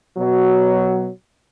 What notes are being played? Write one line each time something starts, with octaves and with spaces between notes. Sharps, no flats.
B2 F#3